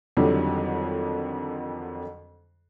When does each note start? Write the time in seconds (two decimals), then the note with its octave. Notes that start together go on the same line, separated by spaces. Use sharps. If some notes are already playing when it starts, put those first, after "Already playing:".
0.17 F2 D3 D#3 F#3 G3 D4